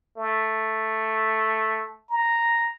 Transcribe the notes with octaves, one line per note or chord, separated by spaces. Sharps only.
A3
A#5